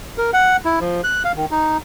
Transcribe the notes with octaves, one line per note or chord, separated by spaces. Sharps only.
A#4
F#5
E4
F3
F#6
F5
D#3
D#4